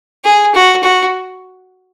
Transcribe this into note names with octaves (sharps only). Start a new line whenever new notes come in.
G#4
F#4
F#4